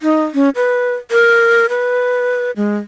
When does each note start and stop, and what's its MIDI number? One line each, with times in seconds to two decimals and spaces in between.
0.01 0.23 63
0.34 0.49 61
0.56 0.95 71
1.11 1.66 70
1.69 2.51 71
2.56 2.76 56